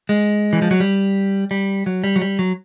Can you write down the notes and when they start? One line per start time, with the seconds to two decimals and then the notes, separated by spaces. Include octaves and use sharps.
0.09 G#3
0.53 E3
0.62 F3
0.71 F#3
0.80 G3
1.51 G3
1.86 F#3
2.04 G3
2.16 F#3
2.22 G3
2.39 F#3